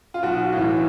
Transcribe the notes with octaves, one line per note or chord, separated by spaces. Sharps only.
F4
B1 F#4
A2 E3